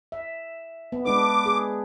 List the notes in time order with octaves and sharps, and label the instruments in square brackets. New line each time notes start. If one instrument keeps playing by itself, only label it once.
[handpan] E5
B3
[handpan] G#3 D4 B4 [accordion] D6
[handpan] G#4